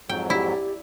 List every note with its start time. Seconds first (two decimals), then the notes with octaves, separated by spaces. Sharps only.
0.09 F2 G#2 F#3 G5
0.30 E4 G4 D5